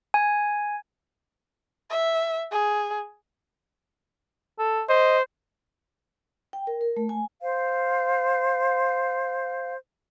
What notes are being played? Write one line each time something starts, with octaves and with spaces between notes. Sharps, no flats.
G#5
E5
G#4
A4
C5 D#5
G5
A#4
A#4
A3
G#5
C5 F5